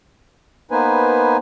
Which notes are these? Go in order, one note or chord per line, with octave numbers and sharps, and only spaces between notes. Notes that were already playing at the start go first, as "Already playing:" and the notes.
A#3 B3 D#4 B4 C5 G#5